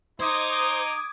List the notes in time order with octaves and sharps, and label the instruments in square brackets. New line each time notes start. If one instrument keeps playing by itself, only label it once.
[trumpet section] D#4 [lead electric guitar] C5 [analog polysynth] D6 D#6 G#6